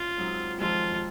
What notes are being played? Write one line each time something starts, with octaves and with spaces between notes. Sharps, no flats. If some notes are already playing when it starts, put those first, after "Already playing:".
Already playing: C#4 F4
G#2 F#3 C4 D#4
F2 D#3 G#3 F4